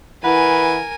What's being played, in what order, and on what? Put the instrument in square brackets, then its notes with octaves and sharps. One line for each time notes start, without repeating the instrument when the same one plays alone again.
[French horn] E3 [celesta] E4 F#5 [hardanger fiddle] A#4 G#5 [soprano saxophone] B4